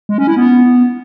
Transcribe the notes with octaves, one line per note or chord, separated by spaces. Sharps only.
G#3
C#4
E4
B3